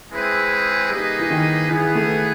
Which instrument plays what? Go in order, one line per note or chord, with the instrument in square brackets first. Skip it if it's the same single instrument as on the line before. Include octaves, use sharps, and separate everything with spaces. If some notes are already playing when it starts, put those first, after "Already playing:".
[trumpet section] G#3 C4 E4 G#4 B4
[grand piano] G3 [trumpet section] A#3 D#4 G#4 B4 D#5
[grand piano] E3
D#3
[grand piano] E3 [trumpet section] B3 E4 G#4 B4
[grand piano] A3